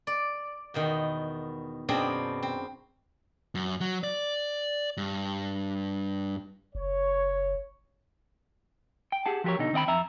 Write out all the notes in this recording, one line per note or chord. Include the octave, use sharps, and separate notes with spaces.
D5
E2 B2 D#3
F#2 B2 C4 D4 G#4
C4
F#2
F#3
D5
G2
F#1 C#5
G5
G4 G#4 F#5 A5
F3 F#4 G4 A#4 C#5
B2 D3 D#4
D#3 C4 D#5 G5 B5
F2 E5 A#5